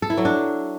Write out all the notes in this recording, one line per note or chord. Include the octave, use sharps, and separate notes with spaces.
A4
E4
F#3
D4